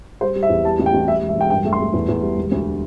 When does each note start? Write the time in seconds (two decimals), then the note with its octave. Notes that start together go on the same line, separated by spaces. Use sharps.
0.21 G3 C5
0.36 G3
0.43 E5
0.50 E2
0.64 G3 A5
0.79 A1
0.86 G5
0.94 A1
1.08 G3 E5
1.22 E1
1.29 E5
1.36 E1 G5
1.50 G2 G5
1.65 A3
1.73 C6
1.80 A3
1.94 E2
2.09 E2
2.22 G3
2.37 E1
2.52 D2